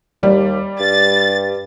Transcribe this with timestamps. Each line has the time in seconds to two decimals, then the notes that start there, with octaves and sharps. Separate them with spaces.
0.23 D#2 G3 D5
0.80 G2 A6